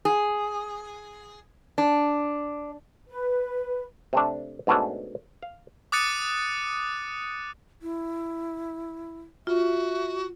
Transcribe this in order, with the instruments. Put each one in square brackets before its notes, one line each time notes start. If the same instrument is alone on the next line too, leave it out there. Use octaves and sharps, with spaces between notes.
[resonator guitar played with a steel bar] G#4
D4
[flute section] B4
[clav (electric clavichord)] C3 A3 D4
G#2 B2 A3 C#4 D4
F5
[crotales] D6 D#6 F#6 A6 C#7 D#7
[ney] E4
[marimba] F4 [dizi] F#4 [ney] E5